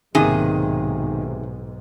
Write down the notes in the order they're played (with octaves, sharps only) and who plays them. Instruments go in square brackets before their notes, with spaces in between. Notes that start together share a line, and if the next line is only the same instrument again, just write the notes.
[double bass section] B1 G#2 [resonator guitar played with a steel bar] C3 G#4 [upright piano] D#3 A#3